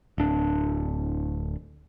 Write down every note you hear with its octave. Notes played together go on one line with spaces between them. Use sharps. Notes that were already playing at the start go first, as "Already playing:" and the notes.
D1 D4